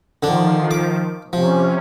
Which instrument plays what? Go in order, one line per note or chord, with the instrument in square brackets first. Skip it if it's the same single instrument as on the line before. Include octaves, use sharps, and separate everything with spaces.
[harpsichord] D3 D4 [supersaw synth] D#3 F3
[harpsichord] D6
[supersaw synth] C3 C#4 [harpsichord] F3